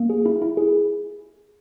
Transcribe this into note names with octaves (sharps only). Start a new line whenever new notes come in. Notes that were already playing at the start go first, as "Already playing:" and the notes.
Already playing: A#3
G#4
E4
E4
G#4